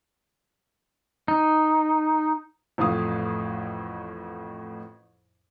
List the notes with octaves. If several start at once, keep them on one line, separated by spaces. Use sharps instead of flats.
D#4
A1 F2 A2 F5 D#6